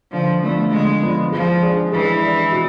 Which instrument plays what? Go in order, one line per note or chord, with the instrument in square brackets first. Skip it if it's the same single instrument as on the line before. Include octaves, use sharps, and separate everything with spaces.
[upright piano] D3 [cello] F3
[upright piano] F3 B3 D4 F4 [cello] A3
[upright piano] D3 [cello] G#3
[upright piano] F3 B3 D4 F4
[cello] F3 [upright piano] G#3
[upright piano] D4 G#4
[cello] E3 [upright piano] G#3
[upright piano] D4 G#4
B2